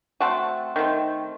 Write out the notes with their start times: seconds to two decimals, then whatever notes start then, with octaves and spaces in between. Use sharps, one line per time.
0.20 A3 C4 F#4 A4
0.76 D#3 A3 C4